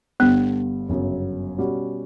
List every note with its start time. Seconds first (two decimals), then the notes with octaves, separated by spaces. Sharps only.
0.20 G1 G2 D3 G3 B3
0.89 G1 F#2 C#3 F#3
1.58 B2 G3 C#4 F#4